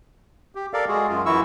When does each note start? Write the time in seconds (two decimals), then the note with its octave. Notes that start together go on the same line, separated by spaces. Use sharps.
0.55 G4
0.73 A4 A#4 D5 F5
0.88 G#3 F#4 G#4
1.09 F#2 F4
1.25 F#2 E3 E4 F#4 C#6 E6